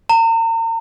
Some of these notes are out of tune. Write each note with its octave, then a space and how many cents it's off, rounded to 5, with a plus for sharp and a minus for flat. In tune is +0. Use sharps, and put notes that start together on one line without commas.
A#5 -40